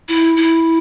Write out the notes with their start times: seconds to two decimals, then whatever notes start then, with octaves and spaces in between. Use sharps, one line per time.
0.09 E4
0.36 E4